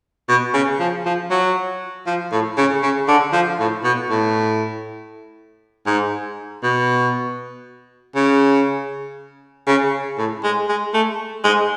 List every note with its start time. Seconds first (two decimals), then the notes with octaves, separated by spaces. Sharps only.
0.28 B2
0.54 C#3
0.80 F3
1.05 F3
1.30 F#3
2.07 F3
2.32 A2
2.57 C#3
2.83 C#3
3.08 D3
3.33 F3
3.59 A2
3.84 B2
4.10 A2
5.87 G#2
6.63 B2
8.15 C#3
9.67 C#3
10.18 A2
10.43 G#3
10.69 G#3
10.94 A3
11.44 G#3